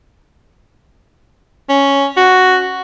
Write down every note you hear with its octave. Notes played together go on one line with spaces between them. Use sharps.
C#4
F#4